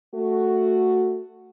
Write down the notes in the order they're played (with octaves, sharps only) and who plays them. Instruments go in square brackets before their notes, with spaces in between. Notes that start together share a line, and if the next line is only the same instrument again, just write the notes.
[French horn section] A3 F#4